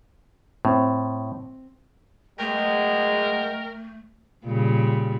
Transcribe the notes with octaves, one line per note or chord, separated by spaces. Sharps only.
A2 C4
B2 F#3 G#3 A3 A#4 G5
A#2 C#3 G3